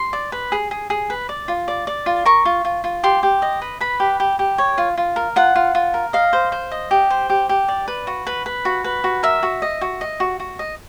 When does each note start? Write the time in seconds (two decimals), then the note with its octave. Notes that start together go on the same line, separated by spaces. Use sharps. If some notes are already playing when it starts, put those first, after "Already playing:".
Already playing: C6
0.13 D5
0.32 B4
0.52 G#4
0.71 G#4
0.90 G#4
1.10 B4
1.29 D5
1.48 F4
1.68 D5
1.87 D5
2.06 F4
2.26 A#4 C#6
2.45 F4
2.65 F4
2.84 F4
3.03 G4 C6
3.23 G4
3.42 D#5
3.62 B4
3.81 B4 B5
4.00 G4
4.20 G4
4.39 G4
4.58 C#5
4.78 F4
4.98 F4
5.16 A#4
5.36 F4 F#5
5.56 F4
5.75 F4
5.94 A#4
6.13 D#5 F5
6.33 C5
6.52 C5
6.72 D#5
6.91 G4
7.10 C5
7.30 G4
7.49 G4
7.68 D5
7.88 B4
8.07 F#4
8.27 B4
8.46 B4
8.65 F#4
8.84 B4
9.04 F#4
9.23 A#4 E5
9.43 F#4
9.62 D#5
9.81 F#4
10.01 D#5
10.20 F#4
10.40 F#4
10.59 D#5